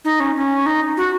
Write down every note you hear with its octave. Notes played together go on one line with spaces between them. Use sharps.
D#4
C#4
C#4
D#4
F#4